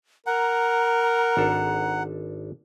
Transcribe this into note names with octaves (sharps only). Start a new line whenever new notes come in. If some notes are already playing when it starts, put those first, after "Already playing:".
A#4 F#5 A#5
G#1 D4 A4